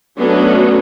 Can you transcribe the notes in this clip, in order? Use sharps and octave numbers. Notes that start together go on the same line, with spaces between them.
F#3 A3 B3 C#4 D4 F#4